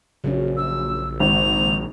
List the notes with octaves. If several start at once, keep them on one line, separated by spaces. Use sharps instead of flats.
A#1 C#3 F#3 C#4
E6
G#1 F7